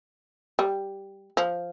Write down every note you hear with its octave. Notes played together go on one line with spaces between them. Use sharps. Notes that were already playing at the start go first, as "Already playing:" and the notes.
G3
F3